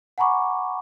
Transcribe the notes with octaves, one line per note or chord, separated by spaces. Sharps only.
F#5 G#5 A#5 B5 C#6 D6